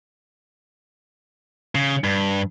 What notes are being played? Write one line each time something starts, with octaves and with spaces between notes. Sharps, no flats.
C#3
G2